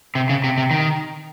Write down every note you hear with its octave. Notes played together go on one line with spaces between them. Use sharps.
C3
C#3
C3
C3
D#3